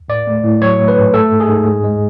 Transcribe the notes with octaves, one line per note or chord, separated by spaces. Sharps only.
A2 D5
A3
A2
F#3 C#5
A3
B4
G#2
A3 A4
G#2
G#4
G#2
G#3
G#3